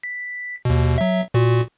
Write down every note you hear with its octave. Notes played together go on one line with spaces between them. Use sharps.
B6
D#2 B2
F#3 E5
A#2 F#4